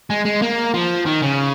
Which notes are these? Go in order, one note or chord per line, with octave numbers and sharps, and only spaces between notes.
G#3
G#3
A#3
F3
D#3
C#3